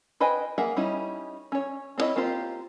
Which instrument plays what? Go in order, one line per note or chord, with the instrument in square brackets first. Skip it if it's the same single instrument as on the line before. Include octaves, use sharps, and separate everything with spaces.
[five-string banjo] B4 C5 D#5 G5 G#5
A#3 G#4 E5 F#5
G3 C#4 D#4 E4
C#4 C#5
C4 D4 E4 C#5 D#5
A#3 C4 F4 G4 C5